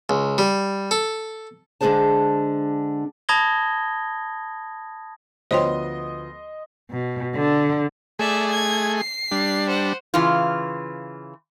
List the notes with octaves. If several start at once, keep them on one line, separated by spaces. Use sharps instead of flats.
C#2
G3
A4
D3 G#3 D4 G#4 C5 A5
A5 B5 D#6 G#6 A#6 G7
D2 F3 B3 C5 C#5 D#5 G5 C6
B2
D3
A3 G#4 D5 E5
G#6
C7
G3 D4
C5 F#5
C#3 E3 F4